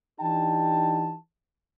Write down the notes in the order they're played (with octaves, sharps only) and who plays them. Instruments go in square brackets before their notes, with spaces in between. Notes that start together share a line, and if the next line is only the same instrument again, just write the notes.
[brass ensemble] E3 D4 D#4 G4 G5 A5